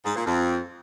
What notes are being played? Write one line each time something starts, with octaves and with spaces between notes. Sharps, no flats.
G#2
A#2
F2